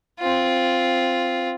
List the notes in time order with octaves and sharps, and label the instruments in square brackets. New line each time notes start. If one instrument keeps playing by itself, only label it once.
[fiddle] C4 F4